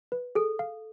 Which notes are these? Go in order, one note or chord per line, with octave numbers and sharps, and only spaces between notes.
B4
G#4 A4
F5